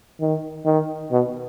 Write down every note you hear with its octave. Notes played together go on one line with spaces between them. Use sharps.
D#3
D#3
B2